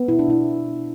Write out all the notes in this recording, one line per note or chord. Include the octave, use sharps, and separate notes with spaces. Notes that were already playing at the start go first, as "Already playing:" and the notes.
Already playing: B3
B2 E4
D4
B2 E4